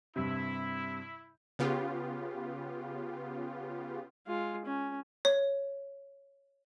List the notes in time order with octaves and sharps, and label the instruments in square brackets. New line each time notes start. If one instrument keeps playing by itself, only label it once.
[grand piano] G2 C3 [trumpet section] E4
[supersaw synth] C#3 B3 F4 G4
[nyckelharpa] G#3 F4
C#4
[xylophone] C#5